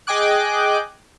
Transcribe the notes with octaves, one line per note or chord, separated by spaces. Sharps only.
G#4 D#5 G5 G#5 D6 F#6